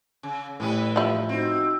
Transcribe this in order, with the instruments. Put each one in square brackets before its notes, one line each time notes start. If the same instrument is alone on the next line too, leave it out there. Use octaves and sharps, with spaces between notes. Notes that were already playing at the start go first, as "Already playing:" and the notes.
[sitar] C#3
[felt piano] A2 [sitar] E3 G3 B4
[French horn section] G2 F4 [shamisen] F3 E4
[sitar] C4 [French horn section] D#4 F#4